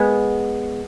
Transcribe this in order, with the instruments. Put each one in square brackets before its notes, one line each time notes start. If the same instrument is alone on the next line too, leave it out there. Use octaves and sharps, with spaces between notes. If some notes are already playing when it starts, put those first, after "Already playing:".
Already playing: [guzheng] G#3 B3